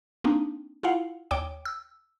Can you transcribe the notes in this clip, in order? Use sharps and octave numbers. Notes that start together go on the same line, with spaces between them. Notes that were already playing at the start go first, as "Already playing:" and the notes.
A#3 C4 D4 D#4
E4 F4 F5 F#5
D#2 C#5 G5 D6 D7
E6